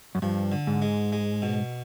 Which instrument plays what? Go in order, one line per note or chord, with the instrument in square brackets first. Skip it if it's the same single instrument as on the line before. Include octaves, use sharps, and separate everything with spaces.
[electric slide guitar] F#2
[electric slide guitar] G2 [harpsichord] F3
[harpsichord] D3
[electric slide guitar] G#2
[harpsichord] G#3
G#3
B2